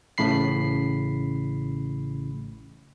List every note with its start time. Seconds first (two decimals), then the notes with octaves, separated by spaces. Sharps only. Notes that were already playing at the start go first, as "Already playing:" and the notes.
0.18 A1 A2 C#3 B5 C7